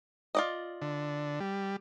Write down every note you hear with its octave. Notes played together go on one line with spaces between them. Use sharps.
F4 D5 D#5
D3
G3